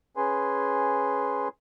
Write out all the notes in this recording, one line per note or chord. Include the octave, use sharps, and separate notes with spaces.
C#4 G#4 B4 G#5 C6